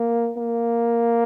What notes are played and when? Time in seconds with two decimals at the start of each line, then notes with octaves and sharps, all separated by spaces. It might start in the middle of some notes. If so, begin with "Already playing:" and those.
Already playing: A#3
0.38 A#3